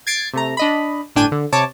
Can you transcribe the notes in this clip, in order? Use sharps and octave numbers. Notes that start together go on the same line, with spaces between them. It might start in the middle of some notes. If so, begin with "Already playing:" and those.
G#6 A6 C7 D7
C3 A3 A#5
D4 D#5 B5
G1 A2 D4 G5 G#5 D#7
D3
C3 C#5 A5 D6